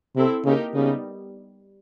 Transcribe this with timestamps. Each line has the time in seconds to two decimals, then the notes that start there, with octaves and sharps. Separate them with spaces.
0.16 C3 C4 E4 A4
0.45 C#3 A#3 D#4 G4 A#4
0.74 C#3 G3 B3 D#4